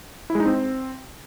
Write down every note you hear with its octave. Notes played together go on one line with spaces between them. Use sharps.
E4
G#3
D#4
C4